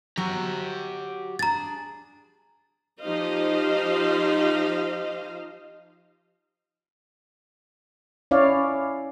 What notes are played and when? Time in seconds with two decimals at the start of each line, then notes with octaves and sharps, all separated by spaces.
0.17 F#3 F#4 G4 A#5
1.39 D4 G#4 A#5 A6
3.02 F3 D#4 G4 C5 D#5 F5
8.31 C#4 E4 C#5 D5 F5